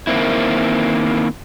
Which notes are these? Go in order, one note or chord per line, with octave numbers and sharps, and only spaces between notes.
D#3 A#3 C4 E4